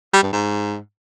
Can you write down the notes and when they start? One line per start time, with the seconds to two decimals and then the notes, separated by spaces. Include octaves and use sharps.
0.13 G3
0.23 G2
0.33 G#2